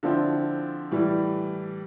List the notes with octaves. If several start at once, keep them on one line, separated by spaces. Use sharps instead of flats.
D3 F3 C4 E4
A2 E3 G3